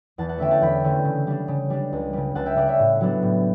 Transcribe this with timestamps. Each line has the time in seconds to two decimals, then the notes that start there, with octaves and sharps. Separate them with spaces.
0.18 E2 F#5 A5
0.29 F#5 A5
0.38 D3 A3 C#4 E5 G5
0.51 F#5 A5
0.61 E2 G5 B5
0.84 D3 A3 C#4
1.05 C#3
1.27 G3 D4
1.48 C#3
1.70 G3 D4
1.93 C#2
2.13 C#3 G3
2.35 C#2 F#5 A5
2.46 E5 G5
2.56 C#3 G3 D5 F#5
2.68 C#5 E5
2.79 A2
3.01 F#3 B3 D4
3.22 A2